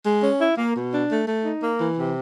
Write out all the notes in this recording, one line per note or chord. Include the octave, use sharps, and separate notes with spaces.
G#3
C#4
E4
A#3
B2
D4
A3
A3
D#4
A#3
E3
C3